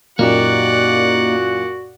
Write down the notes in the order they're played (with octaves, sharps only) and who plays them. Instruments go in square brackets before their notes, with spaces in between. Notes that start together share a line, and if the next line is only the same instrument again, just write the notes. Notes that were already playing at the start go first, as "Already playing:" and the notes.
[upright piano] F#2 A#2 [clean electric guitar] A#3 D#4 G4 [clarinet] F#4 [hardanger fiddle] D5 F#5